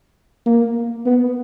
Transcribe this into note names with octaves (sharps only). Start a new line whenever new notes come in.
A#3
B3